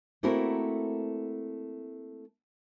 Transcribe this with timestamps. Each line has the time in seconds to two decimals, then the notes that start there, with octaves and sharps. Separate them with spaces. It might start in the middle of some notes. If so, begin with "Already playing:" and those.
0.23 A3 A#3 C4 E4 F#4 A#4